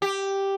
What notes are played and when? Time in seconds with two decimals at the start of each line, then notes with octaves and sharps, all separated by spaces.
0.02 G4